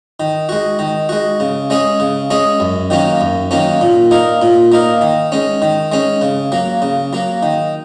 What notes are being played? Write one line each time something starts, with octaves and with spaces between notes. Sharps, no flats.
D#3
G#3 F#4
D#3
G#3 F#4
C#3
G#3 C#4 G#4
C#3
G#3 C#4 G#4
F#2
D#3 F#3 A#3 C#4
F#2
D#3 F#3 A#3 C#4
A#2
A#3 D#4 A#4
A#2
A#3 D#4 A#4
D#3
G#3 C#4
D#3
G#3 C#4
C#3
F#3 A#3
C#3
F#3 A#3
D#3